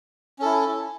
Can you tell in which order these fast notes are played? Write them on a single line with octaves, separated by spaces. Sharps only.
C#4 A4 E4